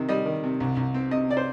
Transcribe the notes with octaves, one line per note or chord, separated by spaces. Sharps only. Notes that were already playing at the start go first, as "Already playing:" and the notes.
Already playing: C3 D#3
G3 D#5
D#3
C3
C2
C2
C4
C3 D#5
C3 D5
C5